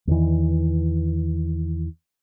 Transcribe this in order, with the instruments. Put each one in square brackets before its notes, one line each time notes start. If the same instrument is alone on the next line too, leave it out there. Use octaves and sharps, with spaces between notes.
[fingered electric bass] E2 D#3 E3